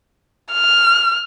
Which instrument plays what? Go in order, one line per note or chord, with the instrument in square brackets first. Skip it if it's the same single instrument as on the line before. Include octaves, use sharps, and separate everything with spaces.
[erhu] F6